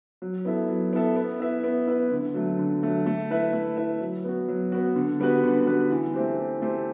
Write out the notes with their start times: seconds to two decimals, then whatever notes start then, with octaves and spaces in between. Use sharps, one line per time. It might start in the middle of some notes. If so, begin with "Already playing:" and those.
0.22 F#3
0.45 B3 E4 A4 E5
0.69 F#3
0.93 B3 E4 A4 E5
1.16 B3
1.39 E4 B4 E5
1.64 B3
1.87 E4 B4 E5
2.12 D3
2.34 F#3 A3
2.59 D3
2.83 F#3 A3
3.06 A3
3.30 E4 B4 E5
3.53 A3
3.77 E4 B4 E5
4.00 F#3
4.24 B3 F#4
4.48 F#3
4.72 B3 F#4
4.96 D3
5.20 G3 B3 F#4 B4
5.43 D3
5.66 G3 B3 F#4 B4
5.90 E3
6.14 A3 C4 G4 C5
6.37 E3
6.62 A3 C4 G4 C5